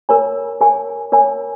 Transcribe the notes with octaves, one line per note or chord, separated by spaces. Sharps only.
A#4 C#5 G#5
A#4 C#5 G#5
A#4 C#5 G#5